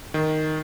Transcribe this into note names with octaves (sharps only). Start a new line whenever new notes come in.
D#3